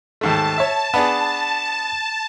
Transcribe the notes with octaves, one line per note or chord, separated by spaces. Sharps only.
D#2 G#2 A3 A5
C#5 E5
B3 D4 G#4